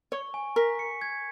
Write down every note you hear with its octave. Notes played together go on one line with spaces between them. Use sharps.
C#5 C#6
G#5
A#4 B6
C#7
G#6